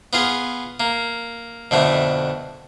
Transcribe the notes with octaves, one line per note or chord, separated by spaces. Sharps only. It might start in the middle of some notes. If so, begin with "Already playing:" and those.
B3 F4 G#4
A#3
F2 B2 D3 A3